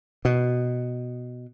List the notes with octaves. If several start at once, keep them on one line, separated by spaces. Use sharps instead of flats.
B2